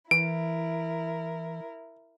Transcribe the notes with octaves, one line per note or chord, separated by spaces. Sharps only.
E3 E4 A#4 D7